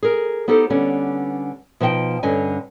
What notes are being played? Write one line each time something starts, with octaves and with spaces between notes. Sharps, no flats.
G#4 A#4
B3 D#4 G4 A4 C5
D3 G3 B3 C#4
B2 F3 D#4 E5 G5 A5
G2 D3 C#4 D#5 G#5